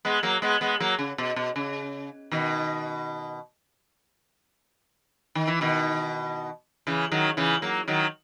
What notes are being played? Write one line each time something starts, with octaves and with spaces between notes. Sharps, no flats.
G#3 B3
F#3 A#3
G#3 B3
G#3 B3
F#3 A#3
C#3
B2
B2
C#3
B2 D#3
D#3
E3
B2 D#3
C#3 E3
D#3 F#3
C#3 E3
F#3 A#3
D#3 F#3